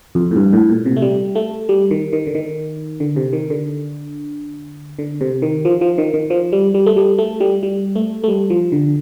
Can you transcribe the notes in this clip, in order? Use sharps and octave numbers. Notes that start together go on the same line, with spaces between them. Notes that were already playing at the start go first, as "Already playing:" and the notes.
F2
A2
G2
A2
A#2
C3
A3
G3
A3
G3
D#3
D#3
D3
D#3
D3
C3
D#3
D3
D3
C3
D#3
F3
F3
D#3
D#3
F3
G3
G3
A3
G3
A3
G3
G3
A3
A3
G3
F3
D3